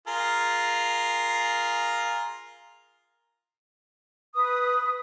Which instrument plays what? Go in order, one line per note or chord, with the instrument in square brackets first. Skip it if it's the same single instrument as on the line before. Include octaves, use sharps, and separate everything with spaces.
[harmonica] F4 G#4 A#4
[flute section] B4 D#6